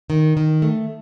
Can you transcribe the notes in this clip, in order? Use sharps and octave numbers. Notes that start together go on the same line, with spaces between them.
D#3
D#3
A3